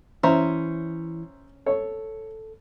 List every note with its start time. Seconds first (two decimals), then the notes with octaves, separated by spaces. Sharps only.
0.23 E3 C#4 E4 C5 E5 A#5
1.66 A4 C#5